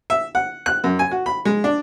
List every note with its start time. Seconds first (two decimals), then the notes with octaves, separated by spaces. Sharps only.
0.10 E5
0.35 F#5
0.66 F#6
0.84 F#2
0.99 G#5
1.11 F#4
1.26 B5
1.45 G#3
1.64 D4